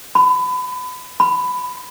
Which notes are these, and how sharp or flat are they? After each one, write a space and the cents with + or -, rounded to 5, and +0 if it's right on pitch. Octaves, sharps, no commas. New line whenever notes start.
B5 +30
B5 +15